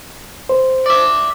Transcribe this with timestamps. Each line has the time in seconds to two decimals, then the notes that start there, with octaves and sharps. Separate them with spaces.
0.49 C5
0.86 D5 E5